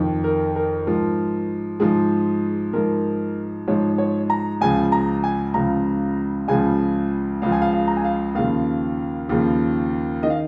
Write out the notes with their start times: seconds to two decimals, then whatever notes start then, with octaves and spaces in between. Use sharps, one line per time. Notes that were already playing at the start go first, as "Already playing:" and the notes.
Already playing: F2 D#3
0.24 A#4
0.56 A#4
0.87 G#2 F3
1.80 G#2 F3 G#4
2.73 G#2 F3 A#4
3.68 G#2 F3 C#5
3.98 C#5
4.30 A#5
4.61 C#2 C#3 F3 G#5
4.92 A#5
5.24 G#5
5.54 C#2 C#3 F3 A#5
6.48 C#2 C#3 F3 G#5
7.42 C#2 C#3 F3 F5
7.52 G#5
7.62 F5
7.73 F5
7.88 A#5
7.97 G#5
8.04 F5
8.35 D#2 C#3 F3 F5
9.29 D#2 C#3 F3
10.23 D#3 D#5
10.30 F5